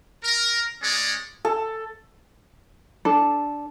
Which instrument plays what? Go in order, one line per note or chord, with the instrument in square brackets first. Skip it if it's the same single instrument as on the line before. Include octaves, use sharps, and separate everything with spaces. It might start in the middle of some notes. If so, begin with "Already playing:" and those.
[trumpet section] A#4
G#3 C#4 G#4 D5
[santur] A4
[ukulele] D4 A4